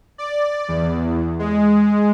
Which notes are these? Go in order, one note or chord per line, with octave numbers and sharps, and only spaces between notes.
D5
E2
G#3